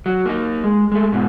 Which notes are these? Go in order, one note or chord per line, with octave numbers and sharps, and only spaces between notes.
F#3
A#3 D#4
G#3
G#3 A3
G#2 B2